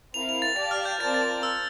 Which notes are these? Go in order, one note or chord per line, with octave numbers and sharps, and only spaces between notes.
C4 E4 A#4 F5 F7
F7
A6
G4 D5 F5 A5 A6
F6
G6
C4 F4 A#4 D5 A5 A6
A6
E6